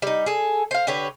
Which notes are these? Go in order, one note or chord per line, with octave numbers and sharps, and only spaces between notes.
G3 D#4
G#4 A4
C5 F5
D3 G4 B4 C#5